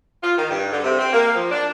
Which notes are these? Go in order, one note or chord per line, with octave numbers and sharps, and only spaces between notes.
F4
D#3
G2
D3
C3
C4
A#3
F3
D4